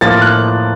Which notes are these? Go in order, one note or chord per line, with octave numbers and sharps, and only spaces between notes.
A2 F3 A#3 A6
F#6